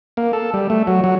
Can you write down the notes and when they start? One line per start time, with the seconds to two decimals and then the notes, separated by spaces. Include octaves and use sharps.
0.17 A#3
0.33 A4
0.54 G3
0.70 A3
0.87 F#3
1.04 F#3